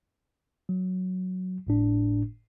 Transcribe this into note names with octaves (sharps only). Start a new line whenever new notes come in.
F#3
G1 A2 D4